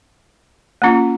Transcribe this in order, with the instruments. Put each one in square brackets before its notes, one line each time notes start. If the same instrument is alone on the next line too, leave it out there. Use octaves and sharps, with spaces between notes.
[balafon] A#3 C#4 F4